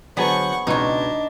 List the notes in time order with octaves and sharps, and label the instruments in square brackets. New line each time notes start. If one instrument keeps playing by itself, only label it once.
[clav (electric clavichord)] D3 F#3 A5 [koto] B3 G#4 [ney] C5 [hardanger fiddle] F#5 C#6
[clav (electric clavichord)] C#2 B2 [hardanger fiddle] D4 [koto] D#4 C#5 [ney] D#5